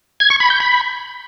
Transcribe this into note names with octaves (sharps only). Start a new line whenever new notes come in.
G#6
C#6
B5
G6
B5